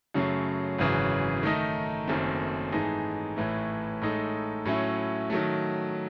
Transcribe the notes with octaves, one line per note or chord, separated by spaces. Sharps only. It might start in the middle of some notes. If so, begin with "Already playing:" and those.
F#2 C#3 F#3 A3
G#1 F#2 C#3 E3
D#3 A3 D#4
F#1 F#2 D#3 A3 C4
G#2 E3 A3 D#4 G#4
A1 A2 E3 A3
A2 G#3 D#4 A4
A2 F#3 C#4 E4
D#3 F#3 A3